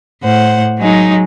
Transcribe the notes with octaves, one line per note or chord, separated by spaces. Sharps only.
A2 C5 F#5
F#3 G#3 D#4